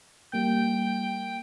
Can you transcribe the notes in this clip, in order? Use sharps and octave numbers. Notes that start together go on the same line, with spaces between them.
G3 A#3 G5 G6